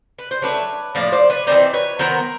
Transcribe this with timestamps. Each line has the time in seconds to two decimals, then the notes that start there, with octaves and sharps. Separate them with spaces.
0.19 B4
0.31 C5
0.42 F#3 A3 D4 B4 C#5
0.95 A2 F3 A#3 D5
1.12 C5 D5
1.30 B4 C#5
1.47 E3 G#3 C4 D#4 C5 D5
1.74 B4 C#5
1.99 D#3 F#3 B3 A#4 C5